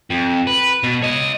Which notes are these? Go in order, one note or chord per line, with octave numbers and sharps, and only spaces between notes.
F2
B4
B2
C#5 D#5